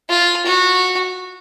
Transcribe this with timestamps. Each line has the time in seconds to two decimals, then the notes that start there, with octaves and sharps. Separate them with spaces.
0.10 F4
0.46 F#4